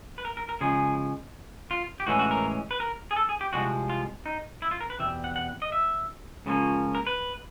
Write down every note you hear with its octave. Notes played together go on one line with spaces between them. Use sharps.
B4
A#4
A#4
A#4
C#3 F3 G#3 G#4
F4
G4
A2 E3 G#3 C#4 F#4
F#4
A#4
B4
A#4
G#4
A4
G#4
G4
C2 C3 F3 G#3 F#4
F4
D#4
E4
F4
A#4
B4
E2 B2 G3 C4 E5
F#5
F#5
D#5
E5
C#2 C#3 F3 A#3 C#4
A#4
B4